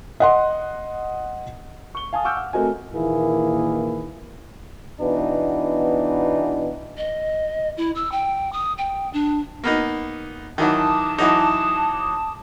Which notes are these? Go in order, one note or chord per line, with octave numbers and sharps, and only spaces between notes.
D#5 F#5 C6
C#6 G7
F5 G#5 A5 D#6
F#5 C#6 D6 E6 F6 G6
F#5
A3 C4 F#4 A#4 D#5 G#5
A#2 D#3 E3 A#3 E4 G#4
B2 E3 B3 D4 D#4
D#5
E4
E6
G5
D#6
G5
D4
A#3 B3 D#4
D#3 E3 F#3 A5 D6 D#6
E3 F#3 D#4